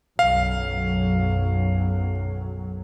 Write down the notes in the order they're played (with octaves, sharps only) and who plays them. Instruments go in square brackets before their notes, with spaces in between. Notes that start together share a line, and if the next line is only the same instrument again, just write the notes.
[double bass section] B1 F#2 F#3 [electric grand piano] F5